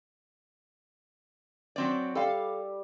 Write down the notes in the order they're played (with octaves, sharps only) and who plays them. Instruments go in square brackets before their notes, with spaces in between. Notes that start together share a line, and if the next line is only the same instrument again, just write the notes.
[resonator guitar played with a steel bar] F#3 C4 D5
[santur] G3 [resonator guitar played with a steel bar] A4 F5